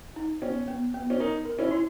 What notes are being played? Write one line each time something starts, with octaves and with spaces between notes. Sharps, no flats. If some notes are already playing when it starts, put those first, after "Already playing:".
D#4
B3 C#4
B3
B3
C#4
D#4 A#4
A#4
C#4 E4
E4